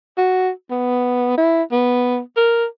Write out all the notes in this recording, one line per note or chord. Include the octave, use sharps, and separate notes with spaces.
F#4
B3
E4
B3
A#4